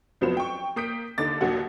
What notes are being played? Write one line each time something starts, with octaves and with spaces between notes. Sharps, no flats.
F1 F3 F#3 B3 C5 E7
G5 C#6
A#3 D#6 G6 B6 D7
D#2 D3 D#4 D6 A6
A#1 D#2 F#3 F#5